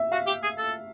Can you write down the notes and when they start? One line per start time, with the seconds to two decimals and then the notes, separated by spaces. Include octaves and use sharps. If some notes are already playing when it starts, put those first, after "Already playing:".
Already playing: E5
0.12 F#4 F5
0.27 G4
0.43 G#4
0.58 A4